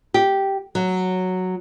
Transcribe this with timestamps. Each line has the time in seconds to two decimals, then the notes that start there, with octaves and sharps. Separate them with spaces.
0.14 G4
0.75 F#3